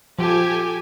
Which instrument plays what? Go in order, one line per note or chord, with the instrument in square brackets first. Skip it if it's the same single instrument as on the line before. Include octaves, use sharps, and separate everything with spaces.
[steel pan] F3 [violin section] G4 A4 G#5